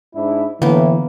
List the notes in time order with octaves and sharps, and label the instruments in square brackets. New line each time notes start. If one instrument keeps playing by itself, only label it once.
[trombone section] G#2 D4 E4
[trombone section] A2 [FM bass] D3 [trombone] E3 [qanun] A#3 B3